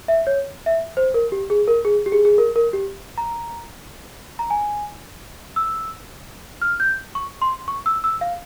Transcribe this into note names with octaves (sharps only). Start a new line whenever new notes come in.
E5
C#5
E5
C5
A#4
G4
G#4
A#4
G#4
G4
G#4
G#4
A#4
A#4
G4
A#5
A#5
G#5
E6
F6
G6
C#6
C6
C#6
E6
E6
F5